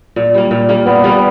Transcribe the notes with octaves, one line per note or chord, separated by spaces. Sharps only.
A#2
G3 A#3
A#2
G3 A#3
A#2 B3
G3 A#3